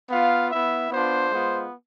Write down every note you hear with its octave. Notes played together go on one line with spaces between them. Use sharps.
B3 F4 F5
B3 E4 E5
B3 D4 F4 C5
G#3 B3 F4